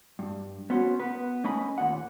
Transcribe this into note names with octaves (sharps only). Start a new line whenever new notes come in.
G2
B3 C#4 F#4 C5
B3 B4
A3 C#4 D#5 G#5 B5
D#2 A#2 F#5